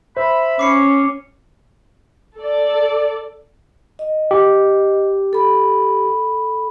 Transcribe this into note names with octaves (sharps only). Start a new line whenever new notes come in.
C5 E5 B5
C#4 D6 C7 C#7
A4 D5
D#5
G4
A4 B5